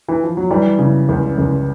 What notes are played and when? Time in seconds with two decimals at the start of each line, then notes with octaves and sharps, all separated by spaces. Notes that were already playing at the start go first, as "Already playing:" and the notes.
0.08 E3
0.23 F3
0.37 F#3
0.51 E3 G3
0.79 C#3
1.09 C#2
1.38 C#2